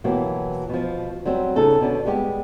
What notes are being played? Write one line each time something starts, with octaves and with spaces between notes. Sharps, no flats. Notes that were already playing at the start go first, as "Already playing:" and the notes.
B2 E3 F#3 A#3 G4
B2 F3
F#3 G3 C4
C#3 D#4 A4
B2 D3 C#4 D4
G3 G#3 B3 F#4 G4